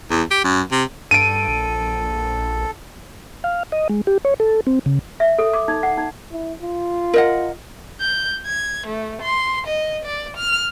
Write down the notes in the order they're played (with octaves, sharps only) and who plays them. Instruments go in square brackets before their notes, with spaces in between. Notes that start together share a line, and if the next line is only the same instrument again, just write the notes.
[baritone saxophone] E2
G4
F#2
C3
[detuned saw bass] G2 [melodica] A4 [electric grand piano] D7 D#7
[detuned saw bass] A#1
[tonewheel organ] F5
D#5
G#3
G4
C#5
A4
C4
C#3
[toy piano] E5
A4
D6
D#4
F#5
D#4
[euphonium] E4
F4
[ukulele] A#4 D#5 F#5
[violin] G6
G#6
A3
C6
D#5
D5
F6